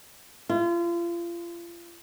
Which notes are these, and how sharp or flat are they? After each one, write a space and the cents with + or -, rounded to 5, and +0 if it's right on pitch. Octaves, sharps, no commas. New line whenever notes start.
F4 -35